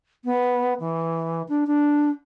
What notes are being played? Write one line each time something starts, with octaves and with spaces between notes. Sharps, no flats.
B3
E3
D4
D4